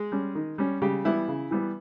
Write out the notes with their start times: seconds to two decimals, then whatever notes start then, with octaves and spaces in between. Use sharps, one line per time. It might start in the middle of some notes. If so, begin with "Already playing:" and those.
Already playing: G#3 G#4
0.12 G3 C#4
0.35 D#3
0.58 G3 C#4
0.82 C#3 G3 G4
1.05 E3 G3 B3 E4
1.28 C#3
1.51 E3 G3 B3